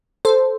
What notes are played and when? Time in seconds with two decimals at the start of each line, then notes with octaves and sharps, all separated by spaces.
0.25 A4 C5